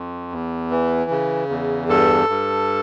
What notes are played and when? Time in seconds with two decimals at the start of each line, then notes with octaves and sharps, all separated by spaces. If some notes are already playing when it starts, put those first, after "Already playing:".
Already playing: F2
0.32 E2
0.71 E3
1.10 C#3
1.49 E2
1.89 G2 A4
2.29 G2